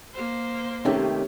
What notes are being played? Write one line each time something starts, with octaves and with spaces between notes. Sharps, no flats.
A#3 C5
C3 D#3 A3 C#4 G4